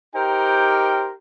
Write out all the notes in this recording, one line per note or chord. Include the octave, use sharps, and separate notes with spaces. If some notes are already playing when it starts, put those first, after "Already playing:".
D#4 G4 A#4 C5 G5